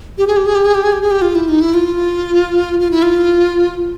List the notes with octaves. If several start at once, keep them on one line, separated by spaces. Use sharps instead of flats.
G4
G#4
G4
G#4
G4
G#4
G4
G#4
G4
G#4
G4
F4
E4
D#4
E4
F4
F4
E4
F4